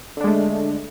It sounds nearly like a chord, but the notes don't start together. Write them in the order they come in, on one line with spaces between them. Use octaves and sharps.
D3 D4 G#3 A3